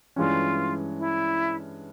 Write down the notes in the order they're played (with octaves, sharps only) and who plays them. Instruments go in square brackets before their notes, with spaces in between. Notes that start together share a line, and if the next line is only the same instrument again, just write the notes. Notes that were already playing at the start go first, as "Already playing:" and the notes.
[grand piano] G2 E3 G#3 C#4 [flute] F4
[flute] E4